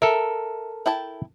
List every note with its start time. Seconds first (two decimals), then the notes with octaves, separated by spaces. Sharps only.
0.02 A4 A#4 E5
0.86 E4 G5 A5